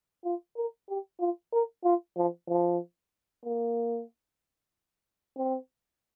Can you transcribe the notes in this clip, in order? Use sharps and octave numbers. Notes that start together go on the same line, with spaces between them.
F4
A#4
G4
F4
A#4
F4
F3
F3
A#3
C4